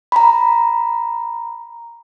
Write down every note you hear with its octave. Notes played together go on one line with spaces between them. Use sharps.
A#5 B5